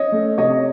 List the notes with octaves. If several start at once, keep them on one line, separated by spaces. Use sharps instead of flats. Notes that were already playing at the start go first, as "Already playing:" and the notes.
Already playing: C#4 C#5 D#5
A3
C3 C#5 D#5